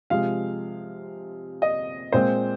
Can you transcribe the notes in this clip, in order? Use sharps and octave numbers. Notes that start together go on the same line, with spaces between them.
C3 F3 G#3 F5
D#5
A#2 G#3 C4 C5